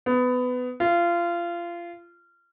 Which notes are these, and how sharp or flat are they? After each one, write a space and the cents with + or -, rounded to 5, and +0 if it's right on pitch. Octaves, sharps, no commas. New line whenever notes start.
B3 +20
F4 -25